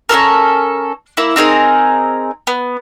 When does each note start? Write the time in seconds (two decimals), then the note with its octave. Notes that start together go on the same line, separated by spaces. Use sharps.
0.09 C#4 G4 A4 A#4
1.17 A#3 E4
1.36 C4 D#4 G#4 A#4
2.47 B3